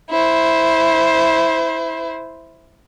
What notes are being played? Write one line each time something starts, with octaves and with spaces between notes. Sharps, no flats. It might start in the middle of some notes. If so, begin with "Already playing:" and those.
E4 C5